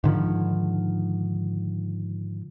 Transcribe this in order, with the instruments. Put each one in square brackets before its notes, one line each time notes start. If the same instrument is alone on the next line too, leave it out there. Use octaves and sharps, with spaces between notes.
[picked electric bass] G#2 D3 D#3 F3